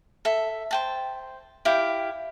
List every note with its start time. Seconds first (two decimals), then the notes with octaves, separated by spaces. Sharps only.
0.25 A4 E5
0.71 C5 G5 A5
1.65 E4 G4 F5 G5